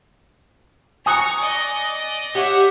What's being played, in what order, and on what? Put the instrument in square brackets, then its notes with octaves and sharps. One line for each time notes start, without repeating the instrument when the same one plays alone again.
[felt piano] G#5 D#6 F#6 [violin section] A#5 C#6
[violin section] D5 D#5
[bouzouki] G4 [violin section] C#5 E5 F#5